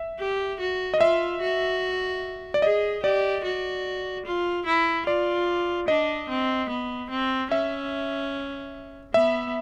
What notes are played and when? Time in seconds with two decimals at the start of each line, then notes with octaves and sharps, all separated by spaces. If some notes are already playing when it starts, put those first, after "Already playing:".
Already playing: E5
0.19 G4
0.60 F#4
0.94 D#5
1.00 F4 E5
1.41 F#4
2.54 D5
2.62 G#4 D#5
3.03 G4 D5
3.44 F#4
4.25 F4
4.66 E4
5.06 F4 D5
5.88 D4 D#5
6.29 C4
6.69 B3
7.10 C4
7.51 C#4 E5
9.14 B3 E5